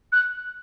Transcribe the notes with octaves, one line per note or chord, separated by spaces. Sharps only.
F#6